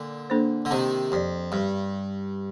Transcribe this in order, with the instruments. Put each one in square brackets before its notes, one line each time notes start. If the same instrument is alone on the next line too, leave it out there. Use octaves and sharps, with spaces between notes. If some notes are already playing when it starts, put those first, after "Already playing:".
Already playing: [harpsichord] A#2 D3
[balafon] A#3 D4 A4 C5
[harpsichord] D3
[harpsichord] C3 D#3 [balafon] C4
[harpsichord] F2 [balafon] G4 D5
[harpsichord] G2 [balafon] G3